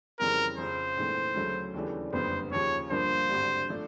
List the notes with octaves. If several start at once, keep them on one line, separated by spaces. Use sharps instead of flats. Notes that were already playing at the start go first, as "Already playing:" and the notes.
F2 C#3 E3 G3 C4 A#4
F2 C#3 F3 C5
A#1 G#2 E3 A3 C4
D2 C#3 F#3 A3
D#2 C#3 E3 A3 D4
F#1 F2 D3 G3 B3 C5
D#2 C#3 F3 C#5
G2 D3 F3 A#3 C5
G#1 G2 D3 G3
F3 A3 D4